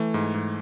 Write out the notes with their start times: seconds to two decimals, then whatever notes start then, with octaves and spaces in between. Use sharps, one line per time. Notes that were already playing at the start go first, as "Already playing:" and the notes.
Already playing: E3 A3
0.14 G#2
0.34 G#2